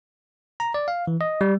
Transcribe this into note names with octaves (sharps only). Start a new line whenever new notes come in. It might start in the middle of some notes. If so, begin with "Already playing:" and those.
A#5
D5
F5
E3
D#5
G3